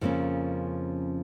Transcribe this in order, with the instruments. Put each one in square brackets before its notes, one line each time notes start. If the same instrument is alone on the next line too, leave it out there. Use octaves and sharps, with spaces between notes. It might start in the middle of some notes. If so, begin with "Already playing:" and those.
[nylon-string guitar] F2 C#3 F3 A#3 C#4